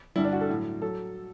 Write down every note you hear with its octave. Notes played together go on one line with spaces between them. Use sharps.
G2 D3 G3 E4
D4
F#4
A4
A2 F#3
F#3 A4